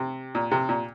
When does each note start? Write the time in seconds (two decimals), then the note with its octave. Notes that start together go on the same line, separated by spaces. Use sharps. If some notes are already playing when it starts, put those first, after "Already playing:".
Already playing: C3
0.35 A#2
0.51 C3
0.69 A#2